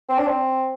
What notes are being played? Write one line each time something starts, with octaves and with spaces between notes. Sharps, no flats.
C4
D4
C4